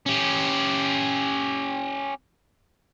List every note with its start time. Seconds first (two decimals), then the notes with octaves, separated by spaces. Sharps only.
0.06 C#4 G4